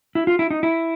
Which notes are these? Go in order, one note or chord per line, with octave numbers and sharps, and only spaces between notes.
E4
F4
E4
D#4
E4